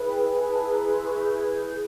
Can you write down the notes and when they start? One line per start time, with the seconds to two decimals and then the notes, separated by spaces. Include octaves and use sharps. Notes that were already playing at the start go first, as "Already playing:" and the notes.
Already playing: E4 G#4 B4
0.08 G5
0.29 G#5
0.51 A5
0.73 A#5
0.88 C6
1.04 C#6
1.20 G6
1.35 G#6
1.57 G6